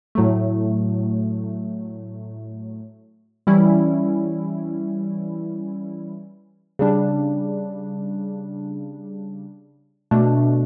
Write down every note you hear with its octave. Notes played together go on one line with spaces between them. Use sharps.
A2 F#3 A3
E3 G3 C#4 E4
C#3 G3 D4
B2 A3 D4